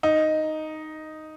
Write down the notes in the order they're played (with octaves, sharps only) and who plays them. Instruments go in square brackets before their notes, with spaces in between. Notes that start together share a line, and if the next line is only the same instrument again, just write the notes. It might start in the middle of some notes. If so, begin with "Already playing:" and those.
[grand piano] D#4